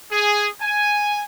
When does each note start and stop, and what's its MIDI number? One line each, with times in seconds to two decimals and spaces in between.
0.11 0.49 68
0.61 1.22 80